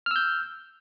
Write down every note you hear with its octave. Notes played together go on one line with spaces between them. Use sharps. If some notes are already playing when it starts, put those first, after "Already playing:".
E6 F6 G6